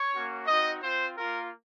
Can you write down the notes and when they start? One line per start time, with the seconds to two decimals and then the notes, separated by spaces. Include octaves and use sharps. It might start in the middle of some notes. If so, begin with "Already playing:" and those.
Already playing: C#5
0.13 A#3 C#4 F#4
0.47 C4 D#4 F#4 D#5
0.81 C4 F4 C5
1.16 A#3 F4 A#4